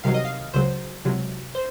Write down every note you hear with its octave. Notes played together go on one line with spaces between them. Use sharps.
C2 C3 D#3 F#3 F5
D#5
F5
C#2 C#3 F#3 C5
C#2 C3 F#3
C5